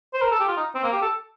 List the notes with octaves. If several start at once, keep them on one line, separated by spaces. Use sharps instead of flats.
C5
A#4
A4
G4
F4
D#4
C4
A#3
G4
A4